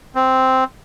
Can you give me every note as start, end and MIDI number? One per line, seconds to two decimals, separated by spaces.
0.15 0.64 60